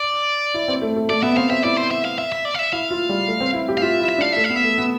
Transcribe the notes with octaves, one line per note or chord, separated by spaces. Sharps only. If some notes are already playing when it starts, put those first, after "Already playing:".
Already playing: D5
E4
C4
A3
A3
A3 D5
B3 E5
C4 F5
C4 E5
E4 D5
C5
E5
F5
E5
E5
D5
F5
E5
E4 F5
F4
G3
A3
C4
E4
G4
F5
F4 E5
E4
E5
D4 F5
A3 E5
F5
B3
E5
A3
B3